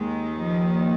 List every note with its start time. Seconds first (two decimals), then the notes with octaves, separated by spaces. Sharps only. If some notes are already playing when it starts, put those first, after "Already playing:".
Already playing: D#2 D#3 G#3
0.41 F3